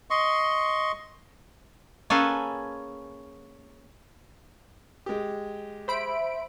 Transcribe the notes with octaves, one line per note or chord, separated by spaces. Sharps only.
D#5 C6 C#6
A#3 C#4 G#4 A4 B4
G#3 G4
C5 E5 B5 D7